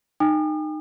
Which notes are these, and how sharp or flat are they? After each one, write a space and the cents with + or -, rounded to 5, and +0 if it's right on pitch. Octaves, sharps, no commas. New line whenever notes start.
D#4 -20 G5 +40 D#6 -45